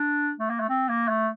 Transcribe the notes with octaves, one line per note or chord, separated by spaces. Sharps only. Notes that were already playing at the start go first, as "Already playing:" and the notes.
Already playing: D4
A3
A#3
A3
C4
A#3
A3